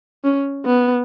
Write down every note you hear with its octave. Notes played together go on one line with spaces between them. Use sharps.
C#4
B3